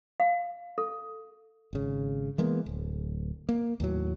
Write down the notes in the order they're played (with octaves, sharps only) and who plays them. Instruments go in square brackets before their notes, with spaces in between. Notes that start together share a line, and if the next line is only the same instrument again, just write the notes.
[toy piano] F5
A4
[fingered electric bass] G#1 C#3
E3 G#3 A#3 B3
D1
A#3
D#2 A2 F#3